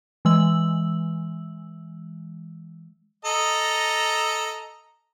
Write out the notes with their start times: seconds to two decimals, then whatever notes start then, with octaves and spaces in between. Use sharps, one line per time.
0.25 E3 G#3 E6 F#7
3.25 A4 D#5 A#5